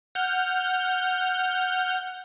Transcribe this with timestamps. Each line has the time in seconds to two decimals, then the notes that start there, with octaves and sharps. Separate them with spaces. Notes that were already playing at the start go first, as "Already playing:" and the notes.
0.15 F#5 F6 G6